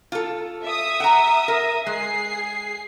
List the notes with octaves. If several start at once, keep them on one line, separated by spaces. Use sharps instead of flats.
F4 A4
E5 D#6
F#5 A#5
A#4
G#3 G#4 C7